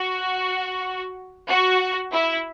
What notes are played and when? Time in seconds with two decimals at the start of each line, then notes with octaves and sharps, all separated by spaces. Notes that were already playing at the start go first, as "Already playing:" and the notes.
Already playing: F#4
1.49 F#4
2.12 E4